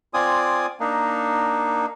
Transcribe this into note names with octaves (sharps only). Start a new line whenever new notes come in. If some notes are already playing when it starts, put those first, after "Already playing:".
C4 F4 D5 G#5 D#6
A#3 D4 D#4